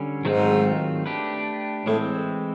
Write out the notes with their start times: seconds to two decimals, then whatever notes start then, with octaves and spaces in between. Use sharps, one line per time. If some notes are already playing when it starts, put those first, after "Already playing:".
Already playing: D3 G3 C#4
0.25 G#2 D#3 F#3 A3 C4 F4
1.06 A3 D4 G4 B4
1.86 A2 E3 G#3 C4